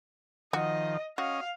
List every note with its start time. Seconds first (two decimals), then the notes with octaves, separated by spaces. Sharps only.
0.53 D#3 F3 F#4 D#5
1.18 C#4 F#4 D#5 F5